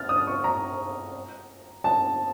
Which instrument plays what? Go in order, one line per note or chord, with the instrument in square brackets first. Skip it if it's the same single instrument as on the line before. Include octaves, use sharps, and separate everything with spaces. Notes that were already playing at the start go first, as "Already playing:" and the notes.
Already playing: [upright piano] F6 A6
D#6
C#6
A#5
A5